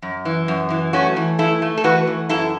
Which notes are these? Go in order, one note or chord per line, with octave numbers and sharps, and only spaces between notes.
F#2
E3
F#2
E3
A3 C#4 F#4
E3
A3 E4 A4
A3
A4
E3 F#4 B4
E3
F#2 E4 A4